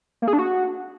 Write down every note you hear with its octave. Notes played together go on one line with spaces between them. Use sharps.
A#3
G#4
D4
F#4